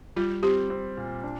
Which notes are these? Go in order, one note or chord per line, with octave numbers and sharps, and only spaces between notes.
G3 F4
C4 G4
C4
A#2
D4